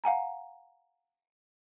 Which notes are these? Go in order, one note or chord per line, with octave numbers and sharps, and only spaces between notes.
F5 F#5 G#5 A#5